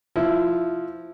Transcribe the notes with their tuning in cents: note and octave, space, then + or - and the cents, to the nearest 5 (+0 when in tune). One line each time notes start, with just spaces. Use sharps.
F3 +0 E4 +5